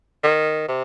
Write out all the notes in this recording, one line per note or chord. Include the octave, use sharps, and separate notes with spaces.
D#3
C3